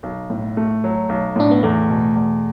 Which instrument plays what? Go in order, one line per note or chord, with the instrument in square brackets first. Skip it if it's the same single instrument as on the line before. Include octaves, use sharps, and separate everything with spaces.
[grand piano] B1
A2
A3
F#3
B1
[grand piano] A2 [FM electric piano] D4
[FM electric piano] B3
[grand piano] E2 [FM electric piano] A3
[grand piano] B2
E2